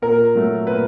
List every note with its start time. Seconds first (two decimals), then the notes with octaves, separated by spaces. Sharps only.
0.02 A#2 A#4
0.35 F#3 A3
0.67 A#2 B4